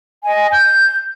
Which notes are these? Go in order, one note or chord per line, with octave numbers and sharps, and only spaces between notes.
D#5 G#5
G6